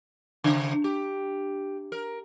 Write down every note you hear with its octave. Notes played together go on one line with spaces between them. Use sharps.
C#3
G4
A#4